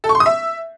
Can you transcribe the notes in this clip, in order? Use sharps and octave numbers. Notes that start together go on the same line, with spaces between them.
A4
C#6
C6
D#6
E5